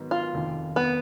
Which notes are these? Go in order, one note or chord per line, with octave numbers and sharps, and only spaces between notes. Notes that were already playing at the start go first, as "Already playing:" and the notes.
Already playing: G#2 D#3 F#3 B3 D#4
F4
F1 D#2 D#3
B3